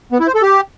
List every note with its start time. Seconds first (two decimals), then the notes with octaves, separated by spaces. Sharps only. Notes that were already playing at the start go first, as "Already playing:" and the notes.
0.12 B3
0.20 E4
0.27 C5
0.35 A4
0.42 G4